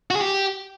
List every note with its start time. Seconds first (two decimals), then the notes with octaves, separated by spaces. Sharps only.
0.11 F#4
0.16 G#4
0.21 G4